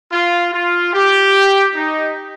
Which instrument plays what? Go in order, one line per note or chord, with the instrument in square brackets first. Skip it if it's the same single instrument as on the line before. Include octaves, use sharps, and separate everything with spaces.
[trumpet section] F4
F4
G4
D#4